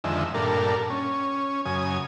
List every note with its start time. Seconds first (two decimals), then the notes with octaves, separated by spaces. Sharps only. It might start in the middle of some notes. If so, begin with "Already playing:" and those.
0.04 F2 D3 D#3 G#3 E5
0.34 G2 A#2 D4 A4 A#4
0.90 C#4
1.65 F#2 C#3 G#5 D#6